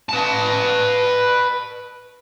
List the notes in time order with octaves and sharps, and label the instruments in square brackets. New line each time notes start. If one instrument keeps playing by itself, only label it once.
[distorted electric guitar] B4 A5